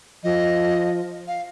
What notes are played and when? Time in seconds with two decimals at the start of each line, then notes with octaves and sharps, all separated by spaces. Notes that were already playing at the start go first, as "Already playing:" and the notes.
0.24 F3 D#5
1.28 F5